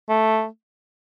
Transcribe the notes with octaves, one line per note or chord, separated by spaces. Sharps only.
A3